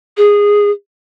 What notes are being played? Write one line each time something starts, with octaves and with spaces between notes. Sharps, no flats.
G#4